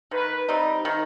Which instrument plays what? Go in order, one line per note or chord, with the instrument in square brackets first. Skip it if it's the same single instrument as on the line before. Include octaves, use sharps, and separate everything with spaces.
[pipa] D#3 [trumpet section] B4
[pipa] G3 C4 D#4
D#3